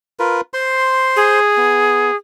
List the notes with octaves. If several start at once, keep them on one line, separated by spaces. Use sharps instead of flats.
F4 A#4 B4
C5 C6
G#4
B3